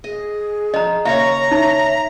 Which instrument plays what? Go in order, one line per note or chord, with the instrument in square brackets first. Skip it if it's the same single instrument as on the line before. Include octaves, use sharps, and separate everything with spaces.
[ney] G#4 [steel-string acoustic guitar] D#5
[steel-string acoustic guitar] F3 [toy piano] D#5 A#5
[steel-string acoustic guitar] D#2 C#3 C#5 [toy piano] E5 F5 [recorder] A#5
[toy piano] D#4 [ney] E5